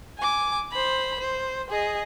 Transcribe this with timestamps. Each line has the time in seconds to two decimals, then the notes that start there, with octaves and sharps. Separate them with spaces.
0.18 G#5 D6
0.72 C5 B5
1.20 C5
1.70 G#4 D#5